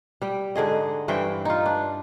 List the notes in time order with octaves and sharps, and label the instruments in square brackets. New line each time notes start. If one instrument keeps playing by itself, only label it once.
[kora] G3 G5
G#2 D3 G#4 D#5
G2 E3 C5 G5
D#4 F4
D4